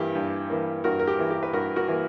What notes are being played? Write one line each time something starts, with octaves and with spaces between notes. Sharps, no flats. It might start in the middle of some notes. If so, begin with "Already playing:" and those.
Already playing: G2 E3 A#3 G4
G2
E3 A#3
G2 F#4 A#4
A#4
G4
E3 A#3
G4
B4
G2 F#4 A#4
F#4 A#4
E3 A#3